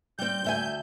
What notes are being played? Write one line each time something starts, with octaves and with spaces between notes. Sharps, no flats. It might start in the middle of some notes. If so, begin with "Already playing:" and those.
G3 C4 G6
D2 E5 G#5